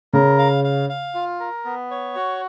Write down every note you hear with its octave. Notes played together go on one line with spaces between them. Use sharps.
C#3 A#4
F5
F5
F5
F4
A#4
B3
C#5
F#4